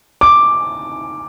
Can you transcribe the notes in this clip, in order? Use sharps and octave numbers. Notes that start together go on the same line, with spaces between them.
D6